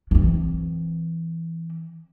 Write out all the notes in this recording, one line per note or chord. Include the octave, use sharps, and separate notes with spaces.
E3 C4